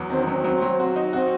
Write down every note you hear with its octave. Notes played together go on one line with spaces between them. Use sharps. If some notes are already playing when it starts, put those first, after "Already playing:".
Already playing: E2 F#3 B3
D#3 C4
D#4
F#3
C4
F#3
F#3
F#4
D#4
C4 F#4